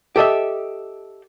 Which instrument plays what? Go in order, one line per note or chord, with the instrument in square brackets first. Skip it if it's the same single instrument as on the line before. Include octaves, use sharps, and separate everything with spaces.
[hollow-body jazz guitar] G4 A4 D#5 E5